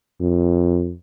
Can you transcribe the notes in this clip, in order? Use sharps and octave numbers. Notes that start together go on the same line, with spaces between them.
F2